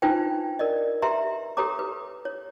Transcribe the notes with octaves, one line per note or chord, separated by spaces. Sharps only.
D4 D#4 F4 B4 C5 G5
A#4 D5 D#5
G4 B4 E5 A#5 C6
G4 A4 B4 C#5 A#5 D6
B4
C#5